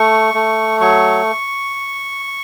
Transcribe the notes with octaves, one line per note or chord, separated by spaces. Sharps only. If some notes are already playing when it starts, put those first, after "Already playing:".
Already playing: A3 C#6
A3
F#3 C#6